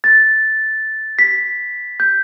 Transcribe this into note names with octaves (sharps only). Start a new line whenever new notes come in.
A6
B6
G6